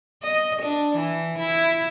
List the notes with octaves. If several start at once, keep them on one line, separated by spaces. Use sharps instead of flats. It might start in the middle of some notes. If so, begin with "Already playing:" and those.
D#5
D4
E3
E4